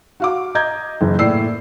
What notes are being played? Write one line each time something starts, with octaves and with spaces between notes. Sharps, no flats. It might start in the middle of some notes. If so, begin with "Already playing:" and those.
F#4 F5 D6
D#5 A#5 G6 G#6
F#1 E3
A2 A#3 D5 E6 C7